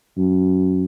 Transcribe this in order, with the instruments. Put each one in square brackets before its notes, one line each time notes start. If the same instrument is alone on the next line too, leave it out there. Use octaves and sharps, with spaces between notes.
[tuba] F#2